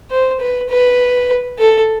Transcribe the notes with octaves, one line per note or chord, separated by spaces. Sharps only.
C5
B4
B4
A4